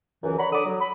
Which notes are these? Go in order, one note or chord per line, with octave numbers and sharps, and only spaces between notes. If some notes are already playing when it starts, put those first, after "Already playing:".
C#2 F#2 E3
C#5 D5 F#5 A#5 B5
D3 C#5 D6 D#6
F#3
B5